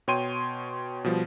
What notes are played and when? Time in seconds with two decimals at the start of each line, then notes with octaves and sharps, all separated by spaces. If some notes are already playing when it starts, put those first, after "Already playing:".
0.08 B2 C#5 G5 C6 D#7
1.04 B2 F3 G3